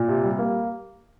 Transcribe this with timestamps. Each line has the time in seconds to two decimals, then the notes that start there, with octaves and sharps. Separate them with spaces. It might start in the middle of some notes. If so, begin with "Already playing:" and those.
Already playing: A#2
0.08 C3
0.23 G3
0.39 A#3